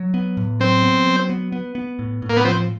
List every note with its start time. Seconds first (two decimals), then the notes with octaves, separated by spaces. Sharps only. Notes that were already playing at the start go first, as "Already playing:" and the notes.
Already playing: F#3
0.14 B3
0.37 A2
0.60 F#3 C4
0.83 B3
1.06 F#3
1.29 B3
1.52 B3
1.75 B3
1.99 A2
2.22 A2
2.30 A#3
2.37 B3
2.45 F3 C4